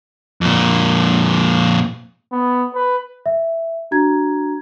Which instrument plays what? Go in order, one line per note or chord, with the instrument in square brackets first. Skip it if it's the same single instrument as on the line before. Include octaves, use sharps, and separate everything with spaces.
[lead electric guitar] F2 A#2
[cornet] B3
B4
[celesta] E5
D4 F#4 A#5 G#6